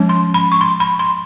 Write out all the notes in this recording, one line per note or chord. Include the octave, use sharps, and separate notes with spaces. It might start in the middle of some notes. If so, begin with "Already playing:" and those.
Already playing: F3 G#3 C#4
C6
B5
C#6
C6
B5
C6